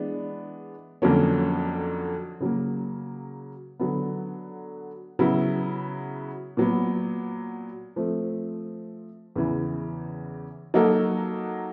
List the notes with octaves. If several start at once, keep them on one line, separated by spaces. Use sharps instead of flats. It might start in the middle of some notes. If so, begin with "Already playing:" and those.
Already playing: E3 G#3 B3 D4
F2 D3 F#3 A#3 C#4
C#3 F#3 A#3
D3 F#3 B3
C#3 F#3 B3 E4
A#2 F#3 B3
F3 A3 C4
E2 C#3 E3
F#3 A#3 D#4 F#4 A4